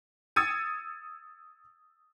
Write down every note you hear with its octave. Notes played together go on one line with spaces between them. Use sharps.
D#6 E6 G#6 A6 C#7 D#7